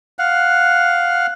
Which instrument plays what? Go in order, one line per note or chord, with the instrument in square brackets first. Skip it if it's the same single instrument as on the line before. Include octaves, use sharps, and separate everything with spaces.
[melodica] F5 F#5